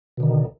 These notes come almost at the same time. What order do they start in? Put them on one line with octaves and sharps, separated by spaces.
B2 D3 D#3